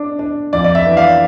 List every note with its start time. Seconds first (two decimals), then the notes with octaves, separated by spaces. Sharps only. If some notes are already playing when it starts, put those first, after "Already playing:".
Already playing: D4
0.19 D4
0.53 F2 D5
0.64 D5
0.75 E5
0.86 E3
0.97 D5 F5